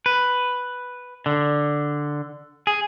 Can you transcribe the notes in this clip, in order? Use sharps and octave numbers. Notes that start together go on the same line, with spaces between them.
B4
D3
G#4